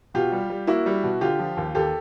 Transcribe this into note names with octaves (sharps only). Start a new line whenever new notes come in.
B2 F4 G4
G3
G3
A#3 E4 F#4
G3
B2
D3 F4 G4
F3
D#2
D#2 G4 A4